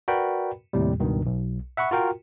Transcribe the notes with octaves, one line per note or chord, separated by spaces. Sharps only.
F#4 A#4 B4 D5 G5 B5
D#2 A2 C3 G3
C#2 G2 B2 D#3
B1
E5 F#5 B5 C#6
F4 F#4 A#4 G5